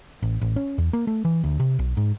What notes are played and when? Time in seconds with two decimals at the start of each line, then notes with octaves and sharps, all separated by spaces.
0.22 A1
0.41 A1
0.56 C#4
0.78 E2
0.93 A#3
1.07 A3
1.25 E3
1.44 D2
1.60 C3
1.79 B1
1.97 G#2